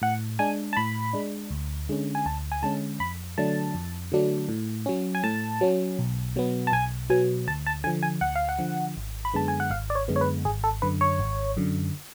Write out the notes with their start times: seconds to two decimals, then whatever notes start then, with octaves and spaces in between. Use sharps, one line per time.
0.02 A2 F#5
0.39 G#3 D4 G#5
0.73 A5
0.77 A2 B5
1.13 G#3 D4
1.51 D2
1.89 D3 G#3 C#4
2.15 G#5
2.26 D2 A5
2.52 G#5
2.62 D3 G#3 C#4 A5
3.00 F2 B5
3.38 D3 F#3 A3 D4 A5
3.74 F2
4.11 D3 F#3 A3 D4
4.49 A2
4.86 F#3 C#4
5.15 G#5
5.24 A2 A5
5.61 F#3 C#4
5.99 B1
6.36 B2 F#3 B3
6.67 A5
6.73 B1 G#5
7.09 B2 F#3 B3 G#5
7.48 D2 A5
7.66 A5
7.84 D3 F3 G#5
8.03 G#5
8.21 D2 F#5
8.35 F5
8.49 F#5
8.58 D3 F3
8.96 G#1
9.25 B5
9.34 F#2 D3 G#3 B3 A5
9.48 G#5
9.60 F#5
9.70 G#1 F5
9.90 D5
9.95 C#5
10.08 F#2 D3 G#3 B3
10.16 C#5
10.21 B4
10.45 G#1 G#4
10.64 A4
10.82 F#2 D3 B4
11.01 C#5
11.19 G#1
11.57 F#2 D3